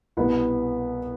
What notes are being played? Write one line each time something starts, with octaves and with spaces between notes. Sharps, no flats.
C2 B2 B3